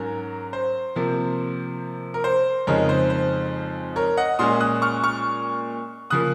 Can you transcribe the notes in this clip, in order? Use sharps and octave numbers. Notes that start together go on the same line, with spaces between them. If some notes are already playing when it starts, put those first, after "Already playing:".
Already playing: G#2 F#3 C#4 A#4
C5
C3 F3 A#3
A#4
C5
F2 C#3 G#3 D#4 A#4 C#5
C5
C5
A#4 C#5
D#5 F#5
A#2 G#3 C#4 C6 D#6
D#6 F#6
C#6 F6
C#6 F6
C#3 F3 A#3 D#6 F#6